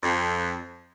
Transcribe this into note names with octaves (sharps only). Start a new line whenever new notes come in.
F2